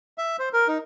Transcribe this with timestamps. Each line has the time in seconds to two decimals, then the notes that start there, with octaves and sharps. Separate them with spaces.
0.18 E5
0.39 C5
0.53 A#4
0.68 D#4